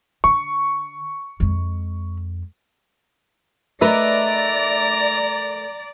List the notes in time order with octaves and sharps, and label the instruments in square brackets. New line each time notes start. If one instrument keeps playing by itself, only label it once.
[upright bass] D3 [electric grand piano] C#6
[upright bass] F2 G#3
[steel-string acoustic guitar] A3 A#4 B4 [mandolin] D#4 E5 [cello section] D5 [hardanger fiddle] A#5